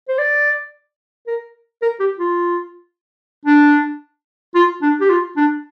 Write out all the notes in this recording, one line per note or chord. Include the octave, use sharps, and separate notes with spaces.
C5
D5
A#4
A#4
G4
F4
D4
F4
D4
G4
F4
D4